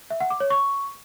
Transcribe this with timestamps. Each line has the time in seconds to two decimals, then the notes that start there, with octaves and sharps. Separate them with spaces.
0.10 E5
0.20 F#5
0.30 D6
0.40 C#5
0.50 C#6